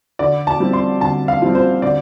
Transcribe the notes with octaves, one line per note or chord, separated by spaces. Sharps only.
D3 D5
A5
G3 C4 F4
C6
D3 A5
F5
G3 C4 F4
C5
D3 D5